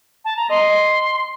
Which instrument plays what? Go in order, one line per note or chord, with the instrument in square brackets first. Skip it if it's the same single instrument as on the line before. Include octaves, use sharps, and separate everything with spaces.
[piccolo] A5
A#5
[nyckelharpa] D#5 [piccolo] C6